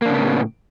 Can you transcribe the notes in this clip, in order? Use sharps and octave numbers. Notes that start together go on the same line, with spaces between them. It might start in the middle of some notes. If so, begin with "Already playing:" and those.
A2 C#3 A#3 B3 D4